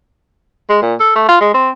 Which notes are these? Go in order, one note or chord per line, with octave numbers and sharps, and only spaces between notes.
G#3
A#2
A4
A3
F4
G#3
C4